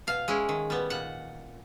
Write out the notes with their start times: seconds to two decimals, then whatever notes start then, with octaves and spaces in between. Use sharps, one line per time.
0.07 B2 F5
0.28 G#3 C#4 E4
0.49 D#3
0.70 G3 B3
0.90 A#2 F#5